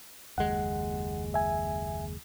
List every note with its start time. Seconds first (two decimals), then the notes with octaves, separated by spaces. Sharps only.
0.38 F#1 D#2 G#3 F#5
1.34 E5 G#5